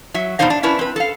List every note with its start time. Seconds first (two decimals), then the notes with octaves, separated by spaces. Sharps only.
0.14 F#3 E5
0.39 B2 B3 D4 D#4 C5 F5
0.50 D4
0.63 C#4 D4 E4 B4
0.79 C4 B4
0.96 A4 F5